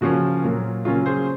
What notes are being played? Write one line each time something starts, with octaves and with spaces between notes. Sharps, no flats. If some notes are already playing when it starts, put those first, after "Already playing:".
C#3 F3 A#3 C#4 F#4
A#2 F#3 A#3
C#3 F#3 A#3 C#4 F4
G#4 C5